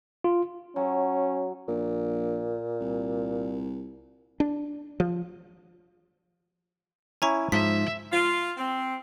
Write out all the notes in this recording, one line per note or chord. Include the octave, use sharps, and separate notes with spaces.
F4
F#3 C#4
A#1 A#2
C2
D4
F3
C#4 E4 G#5 A#5 C#6
G#2 F3 E5 B6
F4
C4